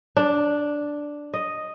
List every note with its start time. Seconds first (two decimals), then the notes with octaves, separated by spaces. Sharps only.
0.17 D4
1.34 D#5